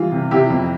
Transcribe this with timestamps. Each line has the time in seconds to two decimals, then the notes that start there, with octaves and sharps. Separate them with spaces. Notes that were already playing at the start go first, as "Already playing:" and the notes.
Already playing: E3 G3 F4
0.12 C3
0.31 C3 E4 G4
0.50 F2